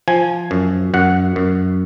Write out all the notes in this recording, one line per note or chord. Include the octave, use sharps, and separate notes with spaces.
F3 G#5
F#2
F#2 F#5
F#2